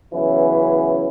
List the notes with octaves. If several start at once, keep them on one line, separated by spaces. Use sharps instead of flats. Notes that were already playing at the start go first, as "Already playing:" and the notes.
C#3 E3 F#3 B3 C#4 E4